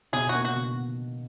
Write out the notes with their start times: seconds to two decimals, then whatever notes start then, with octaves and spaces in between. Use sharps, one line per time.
0.13 B2 G#4
0.29 F#4
0.34 A#3
0.45 F#4
0.56 B2